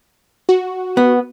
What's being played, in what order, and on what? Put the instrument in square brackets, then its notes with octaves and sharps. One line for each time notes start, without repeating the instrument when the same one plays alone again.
[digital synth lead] F#4
[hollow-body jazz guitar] B3